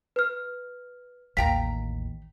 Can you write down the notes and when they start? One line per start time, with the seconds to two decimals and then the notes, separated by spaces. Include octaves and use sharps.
0.16 B4 F6
1.37 A1 D#2 F5 G5 A#5 B6